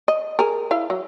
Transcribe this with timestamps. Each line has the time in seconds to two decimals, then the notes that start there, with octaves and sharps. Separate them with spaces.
0.08 D#5
0.39 G#4 A#4
0.71 E4 F5
0.90 F#3